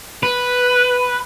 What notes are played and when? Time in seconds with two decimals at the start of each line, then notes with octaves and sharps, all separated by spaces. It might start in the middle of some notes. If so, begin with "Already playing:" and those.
0.23 B4